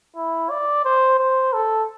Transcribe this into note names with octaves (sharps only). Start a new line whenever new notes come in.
E4
D5
C5
C5
A4